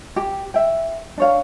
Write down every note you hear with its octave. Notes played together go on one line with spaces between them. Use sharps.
G4
E5 G5
D4 C#5 F5